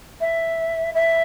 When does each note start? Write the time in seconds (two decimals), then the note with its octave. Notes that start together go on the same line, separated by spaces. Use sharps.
0.20 E5
0.94 E5